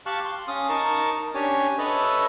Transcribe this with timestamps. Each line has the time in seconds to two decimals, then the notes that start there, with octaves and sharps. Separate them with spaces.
0.06 G4 F5 A5 C#6 F#6
0.25 C6
0.48 C#4 F5 D#6
0.69 D#4 A#4 A5 C#6
1.35 C#4 D4 G4 C#5 G#5
1.78 A4 B4 C#5 D#5 E5